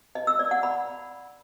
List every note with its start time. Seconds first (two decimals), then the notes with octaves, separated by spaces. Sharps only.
0.15 D#5
0.27 E6
0.39 D5
0.51 F#5
0.63 B5